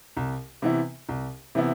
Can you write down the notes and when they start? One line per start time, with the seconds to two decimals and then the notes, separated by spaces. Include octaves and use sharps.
0.17 C2
0.62 C3 E3 B3 E4
1.09 C2
1.55 C3 E3 B3 E4